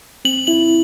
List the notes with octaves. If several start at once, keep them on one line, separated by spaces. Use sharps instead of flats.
C4 F#7
E4 F#7